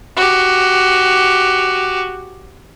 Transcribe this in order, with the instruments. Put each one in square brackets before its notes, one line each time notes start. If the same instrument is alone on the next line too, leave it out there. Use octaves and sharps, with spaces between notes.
[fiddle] F#4 G4